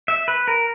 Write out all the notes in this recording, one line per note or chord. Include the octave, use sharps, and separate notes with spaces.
E5
B4
A#4